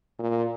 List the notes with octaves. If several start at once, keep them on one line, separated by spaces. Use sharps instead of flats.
A#2